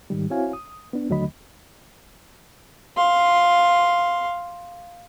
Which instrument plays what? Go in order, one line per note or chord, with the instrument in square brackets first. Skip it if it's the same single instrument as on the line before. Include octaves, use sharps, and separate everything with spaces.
[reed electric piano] G#2 D#3 G3
C4 E4 F#4 C#5 F5 G#5
D#6
B3 D4
D#2 D3 F#3 A3 D#5 B5
[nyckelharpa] F5 C6